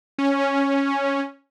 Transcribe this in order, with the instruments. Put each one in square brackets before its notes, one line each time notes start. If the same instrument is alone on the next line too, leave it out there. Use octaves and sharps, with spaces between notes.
[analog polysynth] C#4